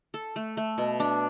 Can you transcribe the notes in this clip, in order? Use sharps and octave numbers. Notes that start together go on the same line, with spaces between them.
A4
A3
A3
B2
D4